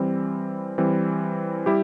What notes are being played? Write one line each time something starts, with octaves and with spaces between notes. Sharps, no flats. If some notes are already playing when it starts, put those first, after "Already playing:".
Already playing: E3 G3 C4
E3 G3 C4
G3 E4 G4